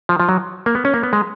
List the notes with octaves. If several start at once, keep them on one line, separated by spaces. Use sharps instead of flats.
F3
F3
F#3
A#3
B3
C#4
A#3
B3
G#3